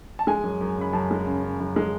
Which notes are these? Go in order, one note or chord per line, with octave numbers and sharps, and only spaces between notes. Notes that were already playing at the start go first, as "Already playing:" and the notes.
A5
G#3 G#5
F#2
F#2
C#3 B5
F#2 A5
G#3
C#3
C#3
F#2
G#3